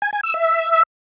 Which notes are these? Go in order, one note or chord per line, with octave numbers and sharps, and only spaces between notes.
G#5
G#5
E6
E5